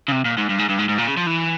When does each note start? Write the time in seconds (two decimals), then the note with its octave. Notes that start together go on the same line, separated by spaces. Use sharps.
0.08 C#3
0.12 C3
0.25 A#2
0.38 G#2
0.50 G2
0.59 G#2
0.70 G2
0.79 G#2
0.89 G#2
0.98 A#2
1.07 C#3
1.17 F3
1.26 E3